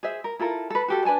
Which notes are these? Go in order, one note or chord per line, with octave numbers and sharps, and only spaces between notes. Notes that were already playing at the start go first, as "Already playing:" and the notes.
G#4 C5 E5
A#4
E4 F4 A4 A#4
A4 B4
F#4 G4 A4
D4 B4 G#5 A5